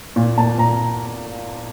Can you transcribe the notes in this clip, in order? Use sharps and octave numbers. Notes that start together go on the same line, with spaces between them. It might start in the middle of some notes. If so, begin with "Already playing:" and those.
A#2
A#2 A5
A#2 A#5